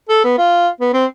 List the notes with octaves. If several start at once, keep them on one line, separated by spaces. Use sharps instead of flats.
A4
B3
F4
B3
C4